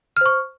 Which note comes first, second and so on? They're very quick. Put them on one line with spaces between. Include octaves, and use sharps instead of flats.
F6 C5 C#6